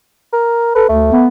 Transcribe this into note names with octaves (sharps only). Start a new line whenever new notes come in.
A#4
A4 B4
D2 A3
B3